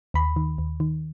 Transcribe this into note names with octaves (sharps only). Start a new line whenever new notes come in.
D#2 B5
D#3
D#2
D#3